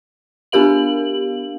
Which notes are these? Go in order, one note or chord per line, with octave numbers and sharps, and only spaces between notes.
B3 D4 G4 A#4 F5 F#7